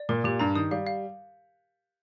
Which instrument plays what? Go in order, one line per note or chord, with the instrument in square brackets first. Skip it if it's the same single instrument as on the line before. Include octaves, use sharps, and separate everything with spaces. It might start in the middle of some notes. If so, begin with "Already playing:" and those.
Already playing: [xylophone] D5
[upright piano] A#2 [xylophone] A#4
[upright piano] A#2 [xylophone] G4
[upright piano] G2 [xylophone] A#5
[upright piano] D#3 [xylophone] D#6
[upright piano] G3 [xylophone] F5
[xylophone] F5